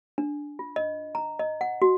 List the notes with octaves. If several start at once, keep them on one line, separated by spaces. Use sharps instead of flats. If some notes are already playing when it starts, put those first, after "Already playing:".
D4
F4
D#5
A#5
D#5
F#5
F#4